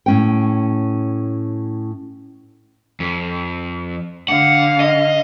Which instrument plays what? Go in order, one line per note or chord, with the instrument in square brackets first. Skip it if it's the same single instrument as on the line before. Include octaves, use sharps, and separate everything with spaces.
[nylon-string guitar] A2 C#4 G5
[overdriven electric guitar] F2
[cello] D3 F5 [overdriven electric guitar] F#5
[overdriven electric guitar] D#5